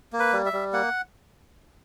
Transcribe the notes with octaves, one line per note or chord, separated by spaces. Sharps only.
A#3
B4
G3
E5
G3
A#3 F#5